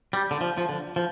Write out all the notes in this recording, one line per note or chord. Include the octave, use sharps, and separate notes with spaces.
G3
D3
F3
F3
D3
F3